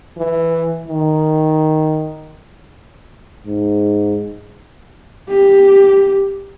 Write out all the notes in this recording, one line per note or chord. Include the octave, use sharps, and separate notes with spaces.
E3
D#3
G#2
G4